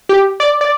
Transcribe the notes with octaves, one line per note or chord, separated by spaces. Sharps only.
G4
D5
D5